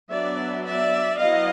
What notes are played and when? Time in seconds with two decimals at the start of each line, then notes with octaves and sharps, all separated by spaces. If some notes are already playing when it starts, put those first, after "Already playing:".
0.12 F#3 B3 D4 D5 E5
0.66 D5 E5
1.20 F#3 B3 E4 D#5 F5